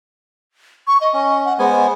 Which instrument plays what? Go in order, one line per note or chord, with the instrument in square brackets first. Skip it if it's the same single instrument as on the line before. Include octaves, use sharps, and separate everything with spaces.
[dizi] C#6
D#5
[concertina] C#4
[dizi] F#5
[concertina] G#3 B3 G#5 [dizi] C5